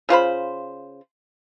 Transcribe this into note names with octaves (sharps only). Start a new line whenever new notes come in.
C#3 F4 C5 B5